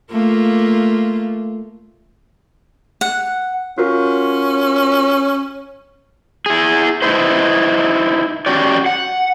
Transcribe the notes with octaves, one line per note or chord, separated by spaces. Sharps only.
A3 A#3 F4
F#5
C#4 F4 F#4 A#4
E4 G#4
D#4 E4 B4 C5
C#4 F#4 G4 D5
F#5